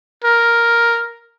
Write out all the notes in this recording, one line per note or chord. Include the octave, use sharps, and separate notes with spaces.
A#4